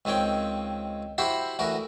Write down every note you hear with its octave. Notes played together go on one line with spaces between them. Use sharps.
C#2 D#3 C4 C#5 G5
E4 F#4 G4 C5 F#5 B5
D2 E3 F#4 A#4